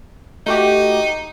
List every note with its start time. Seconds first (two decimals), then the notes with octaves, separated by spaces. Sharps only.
0.46 A3 D#4 F#4 G4